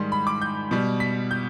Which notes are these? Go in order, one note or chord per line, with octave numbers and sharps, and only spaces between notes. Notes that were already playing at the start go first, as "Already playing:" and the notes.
Already playing: G#2 D#3 G3 C6
B5
D6
G6
B2 G3
B6
G6